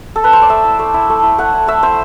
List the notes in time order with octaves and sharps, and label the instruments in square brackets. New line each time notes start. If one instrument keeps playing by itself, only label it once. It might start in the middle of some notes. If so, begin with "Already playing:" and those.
[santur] A4
B4
C5
D5
A3 E5
E4
A3
E4
A3
E4
A3 F#5
E4
A3 E5
E4 C5